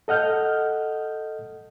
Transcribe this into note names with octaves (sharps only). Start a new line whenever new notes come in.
A4 D#5 F#5 F6 G6